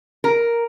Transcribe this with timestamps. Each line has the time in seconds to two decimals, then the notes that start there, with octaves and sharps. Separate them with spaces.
0.24 A#4